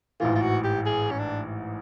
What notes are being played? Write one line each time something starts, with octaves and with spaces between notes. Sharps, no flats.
A1 G#2 E3 F4
F4
F#4
G4
G#4
C#4
D4